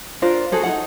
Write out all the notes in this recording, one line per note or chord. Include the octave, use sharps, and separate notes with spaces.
D4 F4 A#4 C5
F#4 G#4 A4 C5
D#4 F4 F#5